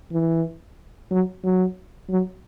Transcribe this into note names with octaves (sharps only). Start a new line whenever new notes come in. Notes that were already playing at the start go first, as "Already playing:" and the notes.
E3
F#3
F#3
F#3